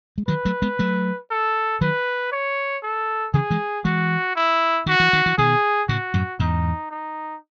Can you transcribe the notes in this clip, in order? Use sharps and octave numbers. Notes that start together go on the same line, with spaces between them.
G#3
D#3 F#3 B4
F#3 A3
G#3 B3
F#3 A3
A4
D#3 F#3 B4
C#5
A4
C#3 E3 G#4
E3 G#3
E3 G#3 F#4
E4
D#3 F#4
E3
D#3
E3
B2 D#3 G#4
A2 C#3 F#4
F#2 A2
E2 G#2 D#4
D#4